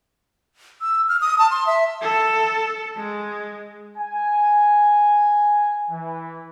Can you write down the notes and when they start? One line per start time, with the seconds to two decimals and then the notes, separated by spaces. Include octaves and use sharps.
0.82 E6
1.09 F6
1.21 D#6
1.39 A5
1.51 C6
1.67 E5
2.02 A4
2.97 G#3
3.98 G#5
5.90 E3